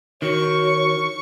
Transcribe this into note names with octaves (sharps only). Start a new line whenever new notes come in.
D#3 F#4 C#5 C#6